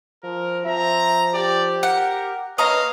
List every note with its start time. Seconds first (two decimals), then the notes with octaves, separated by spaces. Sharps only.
0.24 F3 A#4
0.66 F3 C4 E5 A#5
1.34 G4 D5
1.83 A#4 F#5
2.58 A#3 D4 B4 C#5 D#5 F5 A#5